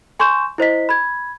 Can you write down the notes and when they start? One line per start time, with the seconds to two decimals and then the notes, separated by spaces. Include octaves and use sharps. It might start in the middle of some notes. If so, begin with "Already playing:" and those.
0.19 G#5 C6 C#6 G6 E7
0.58 E4 C5 D#5 B6
0.89 B5 G#6